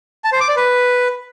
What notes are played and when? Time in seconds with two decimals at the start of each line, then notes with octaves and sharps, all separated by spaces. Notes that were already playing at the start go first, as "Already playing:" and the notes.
0.24 A5
0.32 C5
0.40 D6
0.49 D5
0.57 B4